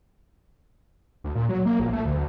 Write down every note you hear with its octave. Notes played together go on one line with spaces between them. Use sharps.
D2
A#2
F#3
A#3
A#1
A3
D2